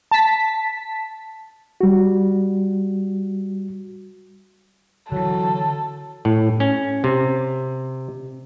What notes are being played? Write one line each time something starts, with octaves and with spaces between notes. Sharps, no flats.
A5 B6
G3 F#4
D3 E3 F#3 A4
A2
C#4
C3